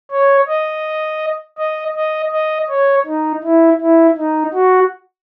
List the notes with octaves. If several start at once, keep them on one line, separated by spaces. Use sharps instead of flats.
C#5
D#5
D#5
D#5
D#5
C#5
D#4
E4
E4
D#4
F#4